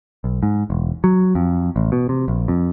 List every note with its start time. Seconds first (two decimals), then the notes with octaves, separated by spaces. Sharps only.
0.24 B1
0.43 G#2
0.70 E1
1.04 F#3
1.35 F2
1.76 A1
1.92 B2
2.09 C3
2.28 A#1
2.48 F2